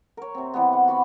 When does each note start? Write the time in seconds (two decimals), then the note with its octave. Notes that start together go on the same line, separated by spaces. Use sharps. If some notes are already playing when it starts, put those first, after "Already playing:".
0.17 A#4 C#5
0.35 C3 C4
0.54 C3 E3 G3 B3
0.73 F#5
0.88 F#4 B5 C#6 D6